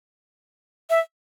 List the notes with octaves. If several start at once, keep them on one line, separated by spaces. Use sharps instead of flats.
E5